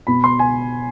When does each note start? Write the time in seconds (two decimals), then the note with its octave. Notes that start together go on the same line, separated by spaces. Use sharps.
0.07 B2 B5
0.24 C6
0.39 G#5